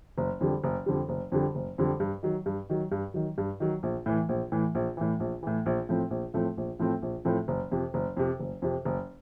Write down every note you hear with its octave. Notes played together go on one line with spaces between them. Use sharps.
F#1
F2 D3 G3
F#1
F2 D3 G3
F#1
F2 D3 G3
F#1
F2 D3 G3
G2
D#3 F#3
G2
D#3 F#3
G2
D#3 F#3
G2
D#3 F#3
A#1
A2 E3
A#1
A2 E3
A#1
A2 E3
A#1
A2 E3
A#1
A2 F3 A3 C4
A#1
A2 F3 A3 C4
A#1
A2 F3 A3 C4
A#1
A2 F3 A3 C4
F#1
F2 C3
F#1
F2 C3
F#1
F2 C3
F#1